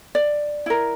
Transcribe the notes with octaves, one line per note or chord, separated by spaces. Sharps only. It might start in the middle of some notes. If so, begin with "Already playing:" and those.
D5
E4 A#4